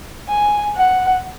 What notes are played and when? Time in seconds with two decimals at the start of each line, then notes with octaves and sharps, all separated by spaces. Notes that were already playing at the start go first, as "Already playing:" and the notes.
0.29 G#5
0.76 F#5